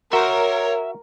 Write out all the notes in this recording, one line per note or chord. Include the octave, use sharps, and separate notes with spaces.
F#4 A#4 C#5 E5 C6